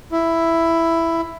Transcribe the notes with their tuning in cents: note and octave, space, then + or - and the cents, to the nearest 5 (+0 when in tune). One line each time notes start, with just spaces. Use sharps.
E4 +5